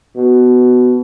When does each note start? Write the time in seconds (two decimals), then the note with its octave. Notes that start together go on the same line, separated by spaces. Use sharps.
0.16 B2